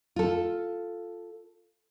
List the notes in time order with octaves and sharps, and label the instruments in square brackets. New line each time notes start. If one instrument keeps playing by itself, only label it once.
[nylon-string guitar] F4 A4